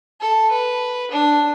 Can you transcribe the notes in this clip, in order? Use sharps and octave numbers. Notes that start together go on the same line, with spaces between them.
A4
B4
D4